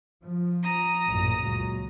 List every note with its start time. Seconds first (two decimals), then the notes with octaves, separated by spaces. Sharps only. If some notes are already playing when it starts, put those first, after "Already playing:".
0.23 F3
0.64 A#5 D#6
1.07 A1 F#2 A#2
1.42 C#2 A#2 F#3